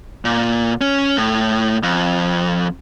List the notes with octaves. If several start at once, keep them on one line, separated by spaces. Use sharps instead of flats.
A#2
C#4
A2
F2